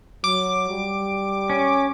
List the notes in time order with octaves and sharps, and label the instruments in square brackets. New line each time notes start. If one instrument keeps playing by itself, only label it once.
[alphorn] F#3 [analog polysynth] D6
[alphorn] G3
[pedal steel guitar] C#4